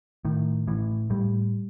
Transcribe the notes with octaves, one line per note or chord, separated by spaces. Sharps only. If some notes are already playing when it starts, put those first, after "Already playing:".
A2 D#3
A2 E3
A2 G3